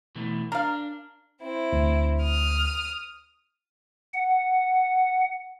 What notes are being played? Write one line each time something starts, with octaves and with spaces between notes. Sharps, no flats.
B2 E3 A3
D4 A#4 F5
C4 E4
D2
D#6 F6
F#5